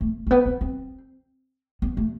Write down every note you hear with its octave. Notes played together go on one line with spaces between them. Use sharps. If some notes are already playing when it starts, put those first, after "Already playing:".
A3
A3
B3
C4
C4
B3
A3